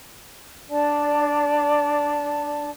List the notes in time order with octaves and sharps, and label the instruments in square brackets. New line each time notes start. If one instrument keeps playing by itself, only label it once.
[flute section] D4 D5 A5